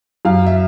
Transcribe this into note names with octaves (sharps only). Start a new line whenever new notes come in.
F#2 F5
E5